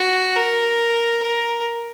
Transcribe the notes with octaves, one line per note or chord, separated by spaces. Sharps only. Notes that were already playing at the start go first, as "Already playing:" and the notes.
Already playing: F#4
A#4
A#4